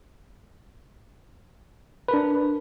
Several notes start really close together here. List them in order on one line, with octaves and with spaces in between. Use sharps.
B4 A#4 D4